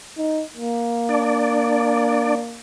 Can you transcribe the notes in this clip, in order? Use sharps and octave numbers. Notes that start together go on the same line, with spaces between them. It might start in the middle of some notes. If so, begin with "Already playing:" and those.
D#4
A#3
D4 D5